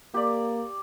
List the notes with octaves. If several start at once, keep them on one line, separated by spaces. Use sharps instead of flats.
A#3 G4 D5